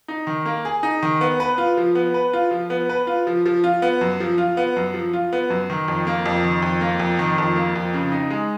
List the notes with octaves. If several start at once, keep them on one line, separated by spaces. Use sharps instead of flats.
D#4
D#3
A#3
G#4
D#4
D#3
B3
B4
F4
F3
B3
B4
F4
F3
B3
B4
F4
F3
F3
F4
B3
F#2
F3
F4
B3
F#2
F3
F4
B3
F#2
D#3
F2
A#3
F2
D#3
F2
A#3
F2
D#3
F2
A#3
F2
C#3
D#4
G#3